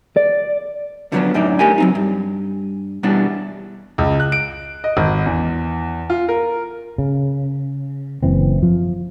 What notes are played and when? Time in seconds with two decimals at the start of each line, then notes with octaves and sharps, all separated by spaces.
0.17 D5
1.12 D3 F3 F#3 G#3 B3 D4
1.34 F#2 A2 D4 D#4 D5
1.59 A3 G4 A#4 G#5
1.78 F#3 C4 D#4
1.95 G2
3.03 E2 B2 E3 G3 B3 D4
3.98 C#2
4.20 F#6
4.32 D7
4.84 D#5
4.97 G#1
5.26 E2
6.10 F4
6.28 A#4
6.98 C#3
8.23 F#1 E3 C4
8.63 F3